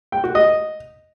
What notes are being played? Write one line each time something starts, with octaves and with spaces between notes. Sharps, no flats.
G5
F#4
D#5